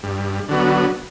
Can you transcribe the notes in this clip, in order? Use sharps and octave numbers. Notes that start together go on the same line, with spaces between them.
G2
D3 F#3 B3